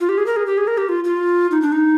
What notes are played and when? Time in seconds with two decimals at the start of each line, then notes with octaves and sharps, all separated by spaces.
0.01 F4
0.09 G4
0.18 G#4
0.26 A#4
0.36 G#4
0.46 G4
0.58 G#4
0.67 A#4
0.78 G4
0.89 F4
1.04 F4
1.51 D#4
1.62 D4
1.72 D#4